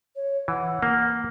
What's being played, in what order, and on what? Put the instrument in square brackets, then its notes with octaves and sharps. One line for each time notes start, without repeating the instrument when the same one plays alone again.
[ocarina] C#5
[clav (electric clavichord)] E3 [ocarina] F#5
[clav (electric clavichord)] A#3